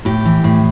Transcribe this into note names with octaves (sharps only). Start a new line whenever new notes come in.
A2 G4
E3
A2